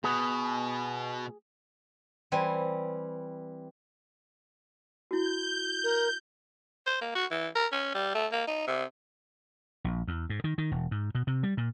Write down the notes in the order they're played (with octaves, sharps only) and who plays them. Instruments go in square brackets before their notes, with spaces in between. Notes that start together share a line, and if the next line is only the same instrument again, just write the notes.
[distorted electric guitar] B2 [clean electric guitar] G#4
[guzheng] E3 G3 C4 G#5
[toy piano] E4 F#4 [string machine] G6
[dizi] A#4
[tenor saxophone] C5
A#3
F#4
E3
A#4
C#4
G3
A3
A#3
D#4
C3
[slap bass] A#1
E2
G#2
D#3
D#3
E1
G#2
B2
C3
G3
A#2